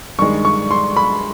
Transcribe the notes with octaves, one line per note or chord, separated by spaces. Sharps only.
G2 D#3 G#3 C#6
C#6
C6
B5